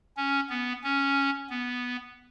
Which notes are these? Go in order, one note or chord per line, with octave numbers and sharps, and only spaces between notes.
C#4
B3
C#4
B3